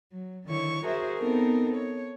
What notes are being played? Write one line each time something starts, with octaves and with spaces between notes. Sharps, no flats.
F#3
D3 D#3 E4 C#5 C#6
F#4 G#4 A#4 C5 E5
B3 C4 D#4 A4 A#4
C#5